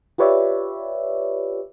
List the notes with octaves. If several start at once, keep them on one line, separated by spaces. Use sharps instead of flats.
F4 G4 B4 C#5 D5 E5